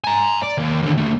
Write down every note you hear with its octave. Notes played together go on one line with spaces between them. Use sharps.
G#5 A#5
D5
D#2
D#2 D3
D#2 A3